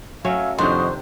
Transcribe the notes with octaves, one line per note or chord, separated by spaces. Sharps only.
F#3 A3 C#4 E5 F5 G#5
F2 C3 D#3 D4 F#4 C5 D#5